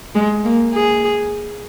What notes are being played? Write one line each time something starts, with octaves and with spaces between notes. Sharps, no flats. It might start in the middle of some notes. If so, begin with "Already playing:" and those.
G#3
A#3
G#4